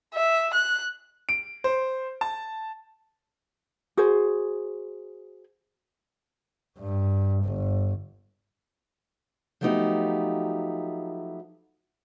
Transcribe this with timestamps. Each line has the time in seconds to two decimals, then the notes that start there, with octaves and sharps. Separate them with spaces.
0.14 E5
0.54 F#6
1.29 D7
1.64 C5
2.21 A5
3.97 F#4 G#4 C5
6.79 G2
7.45 G1
9.61 F3 F#3 A3 B3 D#4 G4